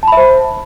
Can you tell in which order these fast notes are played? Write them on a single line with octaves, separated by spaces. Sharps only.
A5 B5 E5 C5